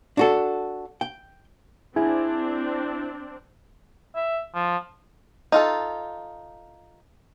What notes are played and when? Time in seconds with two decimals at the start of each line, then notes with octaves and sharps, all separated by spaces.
0.17 D4 F#4 A4
1.01 G5
1.96 C4 D4 E4 G#4
4.16 E5
4.55 F3
5.52 D#4 F4 A4